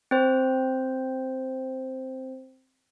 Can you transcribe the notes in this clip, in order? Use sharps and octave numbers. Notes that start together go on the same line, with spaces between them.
C4 C5